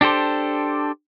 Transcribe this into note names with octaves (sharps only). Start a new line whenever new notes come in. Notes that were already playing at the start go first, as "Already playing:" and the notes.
D4 G4 A4 C5